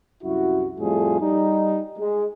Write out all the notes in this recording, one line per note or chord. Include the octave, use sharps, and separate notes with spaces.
C2 F#2 E4 F#4
F2 A2 G3 A3 F4 G#4
G3 D#4
G#3